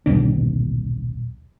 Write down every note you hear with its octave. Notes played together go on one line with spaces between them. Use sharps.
D#1 B1 D4